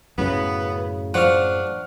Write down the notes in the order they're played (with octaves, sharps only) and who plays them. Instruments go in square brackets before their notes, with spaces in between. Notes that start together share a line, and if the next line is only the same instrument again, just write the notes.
[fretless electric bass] F#2 A2 C#3 [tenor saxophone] B3
[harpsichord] F3 [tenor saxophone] D4 [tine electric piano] F#5 C#6 F6